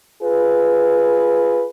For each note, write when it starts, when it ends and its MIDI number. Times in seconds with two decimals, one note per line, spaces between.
0.23 1.67 65
0.23 1.67 68
0.23 1.67 71